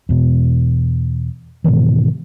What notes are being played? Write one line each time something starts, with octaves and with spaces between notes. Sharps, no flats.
E2 B2
G#2 B2 D#3 E3